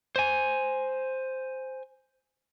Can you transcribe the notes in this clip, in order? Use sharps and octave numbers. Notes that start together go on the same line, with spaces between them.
C5 G#5